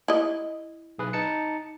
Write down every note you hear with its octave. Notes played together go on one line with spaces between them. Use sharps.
E4 D#5
B1 G#4 B4
D#4 A5 C#7